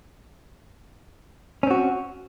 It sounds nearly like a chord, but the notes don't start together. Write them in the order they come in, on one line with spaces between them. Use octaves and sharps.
C#4 C4 F#4